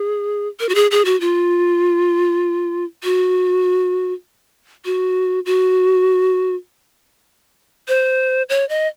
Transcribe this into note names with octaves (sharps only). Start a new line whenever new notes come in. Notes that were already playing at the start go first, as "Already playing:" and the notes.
Already playing: G#4
A#4
F#4
G#4
G#4
F#4
F4
F#4
F#4
F#4
C5
C#5
D#5